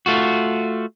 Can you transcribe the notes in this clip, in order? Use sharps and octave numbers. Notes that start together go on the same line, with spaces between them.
A3 F4 F#4